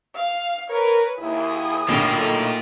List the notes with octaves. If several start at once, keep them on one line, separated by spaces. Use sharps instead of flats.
F5
A#4 B4 C#5
D#2 E4 G#4 D#6
B1 A2 D3 A#3 F4
A3 D#4